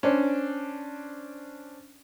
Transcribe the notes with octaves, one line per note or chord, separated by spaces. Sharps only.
C#4 D4 C5